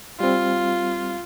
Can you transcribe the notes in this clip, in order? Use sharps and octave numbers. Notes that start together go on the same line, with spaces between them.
G3 C4 F4